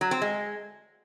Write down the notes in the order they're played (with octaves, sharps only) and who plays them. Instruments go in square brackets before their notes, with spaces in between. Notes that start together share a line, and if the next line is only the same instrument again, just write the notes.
[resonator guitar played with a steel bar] F#3
C4
G#3